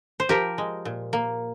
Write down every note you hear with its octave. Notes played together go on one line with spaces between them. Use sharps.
C5
F3 G4 A#4
G#3
A#2
A#3